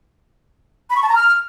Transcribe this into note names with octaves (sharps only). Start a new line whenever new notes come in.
B5
C#6
A5
A#5
F6